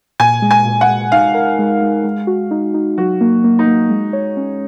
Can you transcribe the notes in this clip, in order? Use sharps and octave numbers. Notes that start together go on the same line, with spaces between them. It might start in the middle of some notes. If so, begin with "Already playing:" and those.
A#2 G#5
G#3
G#5
A#2
F#5
G#3
D#4 F5
A#4
G#3
G#3
G#3
F#4
D#4
D#4
F#3 F#4
A#3
A#3
D#4
A#3
G#3
C#5
C#4